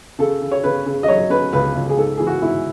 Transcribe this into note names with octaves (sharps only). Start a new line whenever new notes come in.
C#3 A4
C#3
C#5
C#3 B4
C#3
D#5
F#3 C#5
C#4 B4
C#2 B4
C#2
G#4
G#2 A4
E3 G#4
F#4
G#2 E4